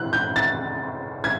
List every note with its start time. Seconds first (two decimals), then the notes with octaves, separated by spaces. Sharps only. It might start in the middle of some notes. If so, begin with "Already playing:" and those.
Already playing: E3 C4 F#6
0.13 G6
0.36 A6
1.24 G#6